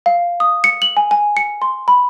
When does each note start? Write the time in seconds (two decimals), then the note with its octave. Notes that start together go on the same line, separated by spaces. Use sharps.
0.06 F5
0.40 D#6
0.64 C#7
0.82 F#7
0.97 G#5
1.11 G#5
1.37 C#7
1.62 C6
1.88 B5